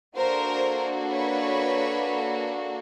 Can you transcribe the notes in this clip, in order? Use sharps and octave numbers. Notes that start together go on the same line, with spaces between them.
A#3 D4 F#4 A4 A#4 C5
B4 C#5